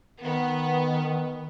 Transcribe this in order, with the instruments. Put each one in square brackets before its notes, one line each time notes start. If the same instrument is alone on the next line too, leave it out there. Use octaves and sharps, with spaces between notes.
[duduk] D#3 [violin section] B3